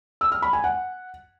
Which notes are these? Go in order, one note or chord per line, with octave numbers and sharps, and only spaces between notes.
E6
F6
B5
G#5
F#5